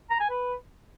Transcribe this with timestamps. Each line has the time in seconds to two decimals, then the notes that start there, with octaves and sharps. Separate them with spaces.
0.10 A#5
0.20 G#5
0.30 B4